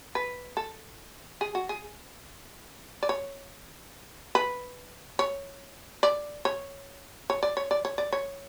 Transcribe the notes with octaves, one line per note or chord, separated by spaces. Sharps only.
B4
A4
G#4
F#4
G#4
D5
C#5
B4
C#5
D5
C#5
C#5
D5
C#5
D5
C#5
D5
C#5